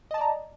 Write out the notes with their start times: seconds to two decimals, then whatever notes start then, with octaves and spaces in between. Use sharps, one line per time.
0.11 D#5
0.14 A5
0.18 D5
0.21 A#5